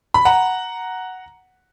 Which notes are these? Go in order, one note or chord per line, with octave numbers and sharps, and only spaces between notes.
B5
F#5 A#5